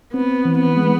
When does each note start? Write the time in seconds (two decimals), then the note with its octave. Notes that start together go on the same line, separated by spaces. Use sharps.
0.13 B3 C4
0.45 E3
0.61 B3
0.77 G#3